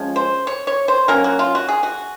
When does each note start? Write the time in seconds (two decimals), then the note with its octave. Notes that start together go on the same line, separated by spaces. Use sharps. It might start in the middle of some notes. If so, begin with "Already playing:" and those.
Already playing: F3 G#3 C#4
0.16 C5
0.47 C#5
0.67 C#5
0.88 C5
1.08 F#3 A#3 C#4 A#4
1.24 F#4
1.39 F4
1.55 F#4
1.68 G#4
1.83 F#4